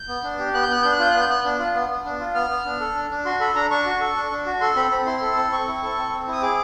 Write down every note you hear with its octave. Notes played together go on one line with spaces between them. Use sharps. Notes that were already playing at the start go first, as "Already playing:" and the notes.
Already playing: G6
B3
D4
G4
B3 F#6
G6
B3 F#6
D4 G6
F#6
F4 G6
B3 F#6
G6
B3 F#6
D4
F4
B3
B3
D4
F4
B3 F6
B3
D4
A4
D4
D4
F#4 C6
A4 B5
D4 A#5
D4 C#6
F#4
A4
D4
D4
F#4
A4 C6
C4 B5
C4 B5
E4 C6
A4
C4
C4 C#6
E4
A4
C4
C4
E4 D#6
G#4 D6